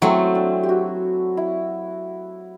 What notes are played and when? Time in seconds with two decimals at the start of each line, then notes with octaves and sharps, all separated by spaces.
0.02 F#3 A3 C4 E4
0.35 D4
0.63 G4
0.69 F#4
1.37 E4